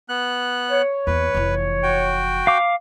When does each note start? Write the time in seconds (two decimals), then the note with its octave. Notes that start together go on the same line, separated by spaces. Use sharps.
0.09 B3 F#6
0.71 C#5
1.07 E2 A#3 B4
1.35 F1 E3
1.83 F#4 G5
2.47 F5 D6